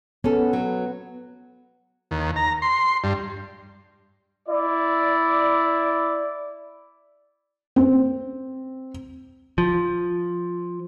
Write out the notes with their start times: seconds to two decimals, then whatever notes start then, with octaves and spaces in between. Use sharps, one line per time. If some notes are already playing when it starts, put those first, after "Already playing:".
0.24 B3 C#4 A4
0.53 F#3
2.11 D#2
2.36 A#5
2.62 C6
3.04 G2
4.49 E4 D5
7.76 C4
9.58 F3